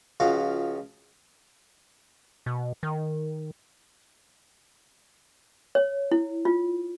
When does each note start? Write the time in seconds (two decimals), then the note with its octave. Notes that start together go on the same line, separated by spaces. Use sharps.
0.20 C#2 C#3 F3 F#4 F5
2.46 B2
2.83 D#3
5.75 C#5
6.11 E4
6.45 F4